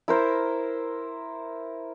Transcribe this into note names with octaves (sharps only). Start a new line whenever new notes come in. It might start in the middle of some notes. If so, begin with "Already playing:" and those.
E4 A#4 C5